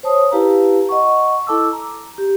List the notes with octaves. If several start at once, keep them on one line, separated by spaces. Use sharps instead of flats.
C5 C#5 A5 D#6
E4 G4 B4 F5 A5 A#5
D#5 F#5 C#6
E4 A4 A5 D6 E6
A#5
G4